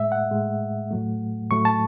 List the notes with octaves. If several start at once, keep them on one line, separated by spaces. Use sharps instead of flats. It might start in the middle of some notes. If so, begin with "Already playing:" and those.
Already playing: A2 G#3 E5
F#5
A2 G#3
A2 F#3 A3
A2 F#3 A3 C#6
A5